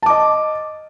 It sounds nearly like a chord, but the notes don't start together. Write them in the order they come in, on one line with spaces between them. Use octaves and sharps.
A5 D6 D#5